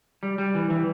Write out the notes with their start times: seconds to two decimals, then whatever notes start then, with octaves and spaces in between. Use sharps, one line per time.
0.23 G3
0.38 G3
0.55 E3
0.70 E3